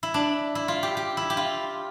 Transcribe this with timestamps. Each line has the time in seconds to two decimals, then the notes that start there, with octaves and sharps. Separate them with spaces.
0.03 E4
0.14 D4
0.55 E4
0.68 F4
0.83 G4
0.97 G4
1.17 E4
1.30 G4
1.37 F4